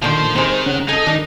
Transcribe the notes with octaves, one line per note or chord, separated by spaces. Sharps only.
A#2 D3 D#3 F3 C5
C3 D#3 G#3 C5
C#3 C#4 F#5
D#4 G#4 A4 G#5 D#6
D#3 D4 D#5